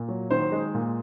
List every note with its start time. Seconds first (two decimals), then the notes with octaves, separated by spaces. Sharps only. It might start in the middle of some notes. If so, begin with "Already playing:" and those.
Already playing: A#2
0.09 F#3
0.31 D#3 C5
0.52 G#3
0.74 A#2